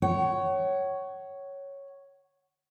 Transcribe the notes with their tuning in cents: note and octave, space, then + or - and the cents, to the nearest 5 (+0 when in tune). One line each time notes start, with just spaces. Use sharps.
C#5 +0 F#5 +35